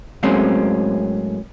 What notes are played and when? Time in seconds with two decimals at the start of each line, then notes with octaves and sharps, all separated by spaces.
0.23 A2 F#3 G#3 A#3 C4 C#4